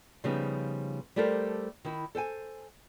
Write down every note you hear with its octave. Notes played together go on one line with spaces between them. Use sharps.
C#3 F3 G3 B3 D#4
G3 A3 G4 A4 A#4 C5
D#3 E4
A4 C5 G5 G#5